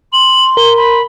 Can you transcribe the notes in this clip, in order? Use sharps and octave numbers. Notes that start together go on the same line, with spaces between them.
C6 F#7
A#4 G7
B5